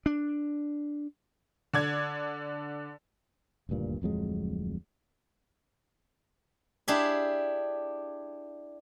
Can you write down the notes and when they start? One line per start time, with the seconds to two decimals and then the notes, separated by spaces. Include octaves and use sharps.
0.06 D4
1.73 D3 D5 G#6
3.69 D#1 D2 G2 A#2
4.02 D1 F2 F#3 G#3
6.88 D4 E4 G4 G#4 E5